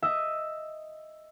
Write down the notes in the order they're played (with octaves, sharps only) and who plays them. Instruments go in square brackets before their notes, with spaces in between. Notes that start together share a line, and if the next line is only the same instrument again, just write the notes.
[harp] D#5 E5